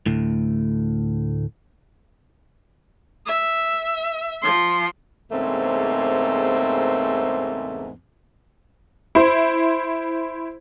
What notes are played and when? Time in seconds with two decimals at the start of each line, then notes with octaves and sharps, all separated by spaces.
0.06 D2 A2
3.26 E5
4.42 F3 C6
5.31 E2 G#2 C#3 A3 A#3 C4
9.15 E4 C5